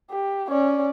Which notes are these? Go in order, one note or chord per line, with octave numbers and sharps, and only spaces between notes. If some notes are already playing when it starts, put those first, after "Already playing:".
G4
C#4 D5